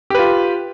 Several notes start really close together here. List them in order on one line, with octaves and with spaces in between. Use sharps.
G4 B4 F4